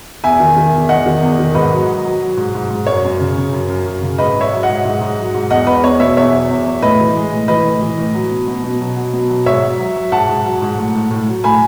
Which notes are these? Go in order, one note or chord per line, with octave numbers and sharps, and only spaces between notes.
E2 E5 G#5
D#3
D#3
E2
E2 D#5 F#5
D#3
E2
D#3
G#2 B4 D#5
F#3
F#3
F#3
F#3
G#2
G#2
G#2
F#2 C#5
F#2
C#3
C#3
F#2
F#2
F#2
C#3
G#2 B4 D#5
G#2
C#5 E5
F#3
D#5 F#5
G#2
G#2
G#2
F#3
G#2
E2 D#5 F#5
E2 B4 D#5
E2 C#5
B2 C#5 E5
E2 C#5 E5
F#3
E2
E2
A2 B4 D#5
E3
G#3
A2
E3 B4 D#5
A2
E3
A2
F#3
B2
B2
B2
F#3
F#3
B2
F#3
G#2 C#5 E5
F#3
F#3
F#3
G#2 F#5 A5
G#2
F#3
G#2
A2
A2
A2
F#3
A2 G#5 B5